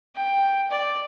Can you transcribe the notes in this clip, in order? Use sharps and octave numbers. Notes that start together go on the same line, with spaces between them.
G5
D5